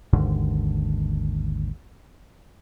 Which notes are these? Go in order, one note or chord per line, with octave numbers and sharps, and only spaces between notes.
G#1 D#2 G#2 D3